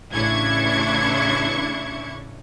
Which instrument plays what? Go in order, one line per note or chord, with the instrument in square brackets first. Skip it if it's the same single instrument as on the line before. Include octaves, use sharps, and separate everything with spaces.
[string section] A1 C#3 D4 E4 C#6 G#6